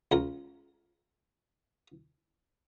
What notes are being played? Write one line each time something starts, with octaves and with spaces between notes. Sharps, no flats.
C#2 A#4